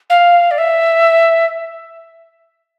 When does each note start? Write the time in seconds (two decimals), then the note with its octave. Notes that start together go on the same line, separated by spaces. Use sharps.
0.10 F5
0.51 D5
0.58 E5